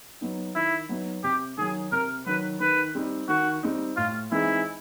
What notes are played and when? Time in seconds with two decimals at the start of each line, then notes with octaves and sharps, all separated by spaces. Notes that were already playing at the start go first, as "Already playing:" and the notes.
0.21 F#3 B3 D#4
0.55 D#3 E4
0.89 F#3 B3 D#4
1.24 C3 G4
1.57 D#3 F#3 G#4
1.92 C3 A#4
2.26 D#3 F#3 B4
2.60 D#3 B4
2.95 G3 C4 D#4
3.28 D#3 F#4
3.63 G3 C4 D#4
3.97 A2 F4
4.31 E3 G#3 C4 D#4 E4